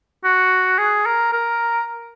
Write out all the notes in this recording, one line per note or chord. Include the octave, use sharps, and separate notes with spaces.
F#4
G#4
A#4
A#4